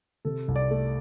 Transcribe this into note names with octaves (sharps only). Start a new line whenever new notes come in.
C3 A4
C2
D5
A3